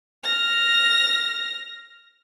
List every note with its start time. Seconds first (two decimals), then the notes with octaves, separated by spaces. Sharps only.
0.24 F6 A#6